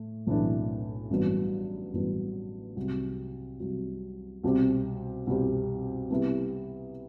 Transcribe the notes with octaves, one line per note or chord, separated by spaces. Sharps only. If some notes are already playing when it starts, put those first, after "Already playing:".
Already playing: A2 A3
B1 A2 E3 A3 D4
A1 G2 F#3 B3
A1 G2 F#3 B3
C2 C3 F#3
C2 C3 F#3
C2 B2 G3 C4 G4
C2 B2 G3 C4 G4
C3 G3 B3 E4 G4